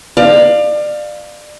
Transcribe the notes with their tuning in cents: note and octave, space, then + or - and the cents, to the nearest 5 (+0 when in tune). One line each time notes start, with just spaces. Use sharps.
D5 +30 F5 +0